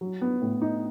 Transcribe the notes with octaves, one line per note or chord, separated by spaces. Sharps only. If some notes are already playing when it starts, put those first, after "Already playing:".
F#3
B3
A2
D#4